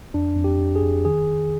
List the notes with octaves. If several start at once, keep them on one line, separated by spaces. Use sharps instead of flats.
F2 D4
F2
G4
F2
G#4
F2
D#3 G#4